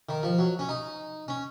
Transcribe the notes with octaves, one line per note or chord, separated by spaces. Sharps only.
D#3
F3
F#3
C#4
D#4
C#4